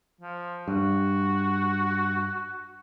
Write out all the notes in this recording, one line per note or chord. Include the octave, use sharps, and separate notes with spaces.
F3
G2 F#4